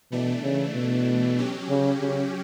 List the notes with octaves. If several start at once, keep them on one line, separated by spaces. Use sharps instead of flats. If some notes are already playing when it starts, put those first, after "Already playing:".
B2 E3 A3 D4
C#3
B2
F#3 C#4 G4
C#3
C#3